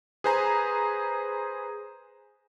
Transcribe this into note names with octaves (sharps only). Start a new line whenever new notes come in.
G#4 B4 C5 G#5 A#5